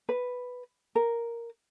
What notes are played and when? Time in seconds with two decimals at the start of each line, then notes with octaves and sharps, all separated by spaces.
0.09 B4
0.95 A#4